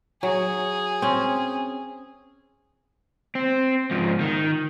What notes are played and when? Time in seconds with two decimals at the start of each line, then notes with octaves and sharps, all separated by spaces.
0.23 F#3 G#4
1.02 C4 C#4
3.35 C4
3.91 G#2 F3
4.20 D#3